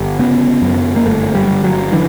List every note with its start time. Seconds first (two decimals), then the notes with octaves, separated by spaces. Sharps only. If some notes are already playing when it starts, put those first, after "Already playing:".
Already playing: G1
0.19 C#3 B3
0.62 F#2
0.96 A#3
1.06 G1 A3
1.35 G3
1.50 G1
1.64 F#3
1.92 D3 E3